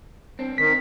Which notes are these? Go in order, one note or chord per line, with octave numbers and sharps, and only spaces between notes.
C4 D4
D#3 B6